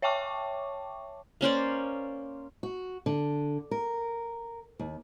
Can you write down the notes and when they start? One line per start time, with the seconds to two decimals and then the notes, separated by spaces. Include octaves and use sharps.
0.02 C#5 E5 G5 A5 C#6 D6
1.41 A#3 C#4 C5 D5
2.63 F#4
3.06 D3
3.71 A#4
4.79 D#2